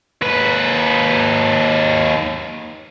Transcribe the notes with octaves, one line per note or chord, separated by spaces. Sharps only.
D#2 B4